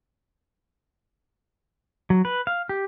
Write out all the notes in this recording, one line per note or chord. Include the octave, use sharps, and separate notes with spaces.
F#3
B4
F5
G4